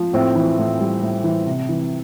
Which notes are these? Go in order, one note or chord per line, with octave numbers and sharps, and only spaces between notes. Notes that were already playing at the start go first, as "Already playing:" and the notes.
Already playing: F3
A2 C4
E3
A2
G3
A2
E3
C3
E3